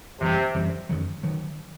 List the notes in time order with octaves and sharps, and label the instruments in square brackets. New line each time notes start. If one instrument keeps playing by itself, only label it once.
[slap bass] F#2 E3 G3 [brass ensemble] C3
[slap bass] F#2 E3 G3
F#2 D#3 F#3
D#3 F#3